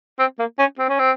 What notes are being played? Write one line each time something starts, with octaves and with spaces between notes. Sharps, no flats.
C4
A#3
C#4
C4
C#4
C4